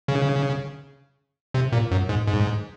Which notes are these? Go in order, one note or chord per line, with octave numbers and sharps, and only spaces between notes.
C#3
C3
A#2
F#2
G#2
G#2